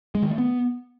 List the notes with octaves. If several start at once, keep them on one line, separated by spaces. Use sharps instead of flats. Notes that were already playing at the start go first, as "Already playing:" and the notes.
G#3
D#3
A3
B3